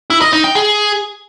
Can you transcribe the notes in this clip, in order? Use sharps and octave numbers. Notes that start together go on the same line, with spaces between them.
E4
D#5
D#4
G5
G#4